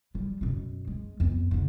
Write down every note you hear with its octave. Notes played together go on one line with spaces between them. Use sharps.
F3 G3
F#2 B2
G#3
F2 B3
G#2 C#3